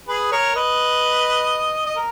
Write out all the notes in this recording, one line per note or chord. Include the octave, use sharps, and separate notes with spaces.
G#4 B4
A#4 C#5
B4 D#5
D#5
A#4